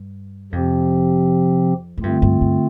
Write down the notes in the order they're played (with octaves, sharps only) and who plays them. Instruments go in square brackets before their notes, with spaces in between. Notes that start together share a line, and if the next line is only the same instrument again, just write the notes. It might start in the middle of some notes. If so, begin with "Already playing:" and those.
Already playing: [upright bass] G2
[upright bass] F2 [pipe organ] C3 F3 C4 G4
[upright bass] A2
[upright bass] G2 [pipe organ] D3 A3 C4 F4
[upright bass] G2
G2